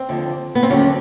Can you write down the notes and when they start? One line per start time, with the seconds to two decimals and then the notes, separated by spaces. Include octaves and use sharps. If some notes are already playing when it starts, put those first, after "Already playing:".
Already playing: C4
0.09 D#2 D3 F3
0.55 B3
0.63 C4
0.70 D#2 D3 F#3 C#4